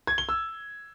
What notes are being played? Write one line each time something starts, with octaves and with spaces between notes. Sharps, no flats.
G#6
G7
E6